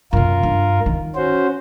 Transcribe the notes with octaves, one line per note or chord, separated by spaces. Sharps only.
F#2 B2 F4 A#4
G2
D#3
C#4 F#4 C5